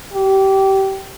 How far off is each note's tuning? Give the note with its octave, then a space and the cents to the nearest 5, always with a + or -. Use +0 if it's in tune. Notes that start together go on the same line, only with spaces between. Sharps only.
G4 -20